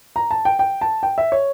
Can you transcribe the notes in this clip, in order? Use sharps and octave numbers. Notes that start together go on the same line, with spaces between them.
A#5
A5
G5
G5
A5
G5
E5
C#5